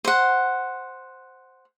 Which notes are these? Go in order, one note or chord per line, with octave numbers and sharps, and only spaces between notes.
C5 F#5